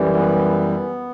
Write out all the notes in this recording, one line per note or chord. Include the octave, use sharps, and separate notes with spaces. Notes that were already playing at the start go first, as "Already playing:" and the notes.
Already playing: F#2 E3 G3
B3